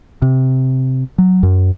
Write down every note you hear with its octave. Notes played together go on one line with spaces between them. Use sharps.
C3
F#3
F#2